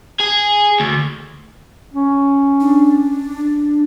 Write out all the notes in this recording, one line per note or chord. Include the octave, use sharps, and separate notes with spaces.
G#4
D2
C#4
D4